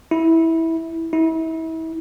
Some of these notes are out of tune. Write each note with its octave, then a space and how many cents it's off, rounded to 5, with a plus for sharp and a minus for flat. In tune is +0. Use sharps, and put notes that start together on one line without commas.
E4 -15
E4 -35